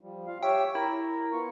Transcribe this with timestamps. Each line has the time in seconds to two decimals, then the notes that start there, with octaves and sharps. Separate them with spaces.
0.01 F3 G3
0.27 F4 F5
0.43 G4 C#5 E5 G5
0.75 E4 A#4
1.32 B3 F4 C#6